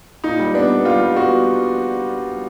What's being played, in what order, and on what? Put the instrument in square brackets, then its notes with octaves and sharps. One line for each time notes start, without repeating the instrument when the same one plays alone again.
[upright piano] A#2 [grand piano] D#4
[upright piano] G3
[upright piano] B3 [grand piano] D4
[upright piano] B3
[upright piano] G3 [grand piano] F4
[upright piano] G3
[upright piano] B3 [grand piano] F#4